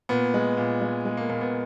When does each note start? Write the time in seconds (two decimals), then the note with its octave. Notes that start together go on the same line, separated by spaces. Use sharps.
0.09 A#2 B3
0.34 G#3
0.57 A#2
0.81 G#3
1.05 G#3
1.17 A#3
1.29 A#2 A#3
1.41 B3